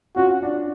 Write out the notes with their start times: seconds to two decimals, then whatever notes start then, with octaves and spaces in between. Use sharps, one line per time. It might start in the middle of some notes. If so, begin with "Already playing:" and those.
0.16 C#4 F4 F#4
0.42 D4